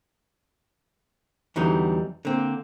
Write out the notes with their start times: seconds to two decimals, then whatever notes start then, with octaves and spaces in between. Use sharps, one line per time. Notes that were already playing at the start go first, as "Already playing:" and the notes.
1.56 E2 D3 E3 F#3 G3 D#4
2.25 D3 A#3 C4